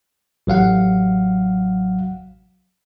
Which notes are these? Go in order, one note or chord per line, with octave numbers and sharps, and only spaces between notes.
A1 F#3 F5 F#5